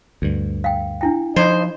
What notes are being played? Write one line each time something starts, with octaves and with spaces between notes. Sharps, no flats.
D2 G2
F5 G5
D4 E4 G5
F3 D#4 C5